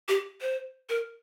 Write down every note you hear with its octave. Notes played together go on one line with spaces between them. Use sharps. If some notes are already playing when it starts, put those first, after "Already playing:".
G4
C5
A#4